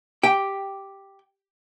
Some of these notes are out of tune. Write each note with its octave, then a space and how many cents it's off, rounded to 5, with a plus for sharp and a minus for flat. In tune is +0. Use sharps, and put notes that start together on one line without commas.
G4 +0 G5 +0